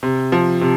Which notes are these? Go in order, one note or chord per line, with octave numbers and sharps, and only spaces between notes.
C3
F3
C3